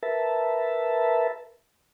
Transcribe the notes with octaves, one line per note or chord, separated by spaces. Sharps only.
A#4 B4 E5 A5